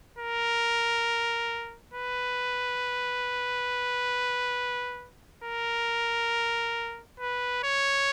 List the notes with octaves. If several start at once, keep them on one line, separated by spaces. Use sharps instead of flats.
A#4
B4
A#4
B4
C#5